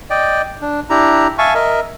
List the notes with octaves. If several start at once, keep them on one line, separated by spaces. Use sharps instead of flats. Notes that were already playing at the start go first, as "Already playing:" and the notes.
D5 D#5 G5
D4
D4 E4 G4 A#5
E5 F5 G#5 A5 C#6
A#4 D#5 E5